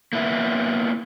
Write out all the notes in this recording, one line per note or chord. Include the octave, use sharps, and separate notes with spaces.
A#3 B3 E4